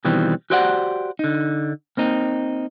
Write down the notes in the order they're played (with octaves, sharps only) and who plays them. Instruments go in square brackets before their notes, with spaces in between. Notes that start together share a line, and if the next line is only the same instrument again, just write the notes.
[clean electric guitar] B2 D#3 E3 G3 C4
F#4 G4 C5 D5 D#5 F#5
D3 D#4
A#3 C4 D#4